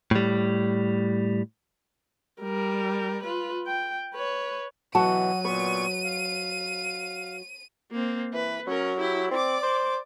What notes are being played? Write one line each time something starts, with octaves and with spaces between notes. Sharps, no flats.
A2 G3
G3 A#4
F4 B4
G5
B4 C#5
B2 E3 F#3 F#4 F#5 A5 D#7
A#2 B3 B4 C#6
F5
A#3 C4
E3 B4
F#3 C#4 A#4
E4 G4
C4 D5 D6
C5